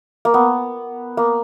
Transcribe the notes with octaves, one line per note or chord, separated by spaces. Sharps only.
A#3
B3
A#3